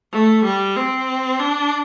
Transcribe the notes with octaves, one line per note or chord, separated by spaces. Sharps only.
A3
G3
C4
D4